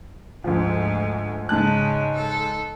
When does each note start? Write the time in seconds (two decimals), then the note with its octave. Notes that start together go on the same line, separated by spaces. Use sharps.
0.44 D2 G#2 F3
1.49 G#2 C#3 G#3 A5 F#6
2.16 A4